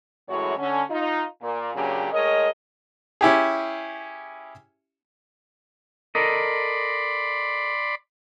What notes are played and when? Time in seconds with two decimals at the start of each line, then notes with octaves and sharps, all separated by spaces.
0.29 F#2 A2 E3 G#3 F#4 C#5
0.58 D3 C#4
0.90 D#4 F4
1.43 A#2 A#3
1.74 A#2 C#3 F#3 C#4 D4 G4
2.12 A2 G#3 A#4 C#5 D#5
3.21 C#4 E4 G4 G#4
6.15 A4 A#4 D5 D#5 B5 C6